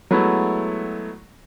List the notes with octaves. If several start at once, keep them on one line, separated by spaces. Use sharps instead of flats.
F#3 G#3 A3 B3 E4